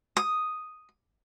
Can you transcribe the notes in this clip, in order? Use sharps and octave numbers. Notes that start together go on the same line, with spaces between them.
D#6